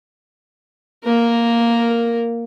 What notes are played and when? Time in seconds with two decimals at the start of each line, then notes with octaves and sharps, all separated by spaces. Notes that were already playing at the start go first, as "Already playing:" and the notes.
1.04 A#3 A#4